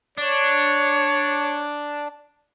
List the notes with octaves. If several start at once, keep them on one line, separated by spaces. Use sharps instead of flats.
D4 C#5